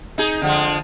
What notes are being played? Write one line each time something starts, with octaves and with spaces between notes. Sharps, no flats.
D#4 G#4
D3 F3 G#3